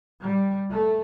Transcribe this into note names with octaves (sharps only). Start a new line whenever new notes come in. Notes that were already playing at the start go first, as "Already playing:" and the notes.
G3
A3